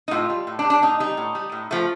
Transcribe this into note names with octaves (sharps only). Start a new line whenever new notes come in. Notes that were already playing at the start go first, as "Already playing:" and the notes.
D#4
A2 F4
G3
A2
D4
G3
D4
A2 D#4
G3 D#4
A2
G3
A2
F3 A3